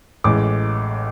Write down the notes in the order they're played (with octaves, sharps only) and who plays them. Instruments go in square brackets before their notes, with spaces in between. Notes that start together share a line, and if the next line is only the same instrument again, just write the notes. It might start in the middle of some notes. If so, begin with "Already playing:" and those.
[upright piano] A1 A2 G#3 D6